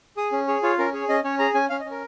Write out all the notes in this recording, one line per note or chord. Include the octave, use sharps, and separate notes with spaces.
G#4 D#6
C#4
G#4 C#5
F4 C#5
C#4 A#4
G#4 C#5
C#4 D#5
C#4 C#5
G#4 A#5
C#4 G#5
C#4 F5
D#5
C#4
A#4